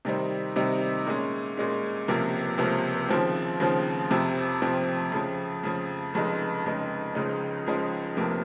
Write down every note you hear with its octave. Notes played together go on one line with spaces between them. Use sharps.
C3 D#3 G3 C4 D#4
C3 D#3 G3 C4 D#4
A#2 G#3 C#4
A#2 G#3 C#4
C#2 C3 F3 A#3
C#2 C3 F3 A#3
D#2 C#3 F3 C4
D#2 C#3 F3 C4
F2 C3 F3 C4
F2 C3 F3 C4
F2 C#3 F3
F2 C#3 F3
F1 F2 C#3 G#3 D#4
F1 F2 C#3 G#3 D#4
C#2 C#3 F3 G#3 D#4
C#2 C#3 F3 G#3 D#4
F1 F2 C3 F3 A#3